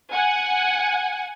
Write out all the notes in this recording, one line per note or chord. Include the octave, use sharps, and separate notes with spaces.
F#5 G#5